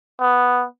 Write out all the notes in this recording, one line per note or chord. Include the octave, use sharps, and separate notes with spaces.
B3